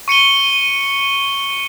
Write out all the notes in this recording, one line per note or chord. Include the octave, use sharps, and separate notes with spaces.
C#6 C#7 D#7 G7